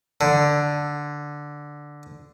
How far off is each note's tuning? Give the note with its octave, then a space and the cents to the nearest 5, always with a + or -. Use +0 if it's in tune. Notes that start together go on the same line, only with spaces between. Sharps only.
D3 +0